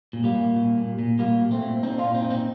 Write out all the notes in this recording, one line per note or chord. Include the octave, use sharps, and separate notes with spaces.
A#2
G3 A#3
A#2
A#2
A#2
A#2
A#2 G3 A#3
A#2
A3 C4
A#2
A#2 C4 D#4
A#2 D4 F4
C4 D#4
A#2
C4 D#4